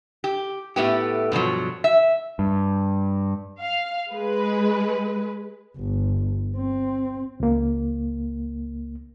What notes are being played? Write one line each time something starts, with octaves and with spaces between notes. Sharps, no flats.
G4
A2 A3 B3 G4
G2 B2 F3 F#3
E5
G2
F5
G#3 B4
G1
C4
C#2 A#3